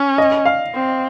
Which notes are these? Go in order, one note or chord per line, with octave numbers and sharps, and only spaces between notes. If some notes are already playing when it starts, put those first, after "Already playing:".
Already playing: C#4
D#5
F5
C4